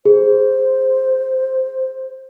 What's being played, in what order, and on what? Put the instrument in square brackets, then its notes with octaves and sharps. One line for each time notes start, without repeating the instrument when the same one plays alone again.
[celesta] G#4 [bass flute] C5